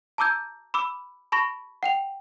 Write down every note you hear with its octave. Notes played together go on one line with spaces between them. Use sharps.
A5 A#5 D6 E6 G6 G#6
B5 D6 E6
A5 B5 C#6 A#6
F#5 G5 F7